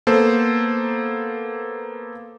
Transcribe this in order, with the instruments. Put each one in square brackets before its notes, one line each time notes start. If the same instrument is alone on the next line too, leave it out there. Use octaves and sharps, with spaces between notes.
[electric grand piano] A#3 B3 A4 C5